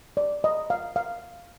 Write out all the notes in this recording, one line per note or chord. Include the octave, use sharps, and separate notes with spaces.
D5
D#5
F5
F5